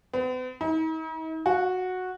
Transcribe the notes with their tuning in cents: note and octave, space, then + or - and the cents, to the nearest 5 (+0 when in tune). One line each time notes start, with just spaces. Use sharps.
B3 +45
D#4 +45
F#4 -10